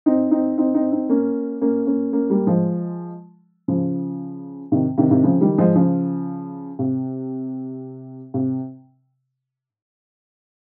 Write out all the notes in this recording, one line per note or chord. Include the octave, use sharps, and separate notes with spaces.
C4 D#4
C4 D#4
C4 D#4
C4 D#4
C4 D#4
A#3 C#4
A#3 C#4
A#3 C#4
A#3 C#4
G3 A#3
F3 G#3
C#3 F3
C3 D#3
C3 D#3
C3 D#3
C#3 F3
D#3 G3
F3 G#3
C#3 F3
C3
C3